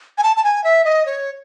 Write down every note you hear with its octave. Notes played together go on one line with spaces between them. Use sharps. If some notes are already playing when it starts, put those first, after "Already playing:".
G#5
A5
A5
G#5
E5
D#5
C#5